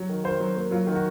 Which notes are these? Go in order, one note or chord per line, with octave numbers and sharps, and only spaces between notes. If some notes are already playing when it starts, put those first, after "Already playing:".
Already playing: F#3
D#3
D#3 C5
F#3
A#3
F#3 F4
D#3
F#4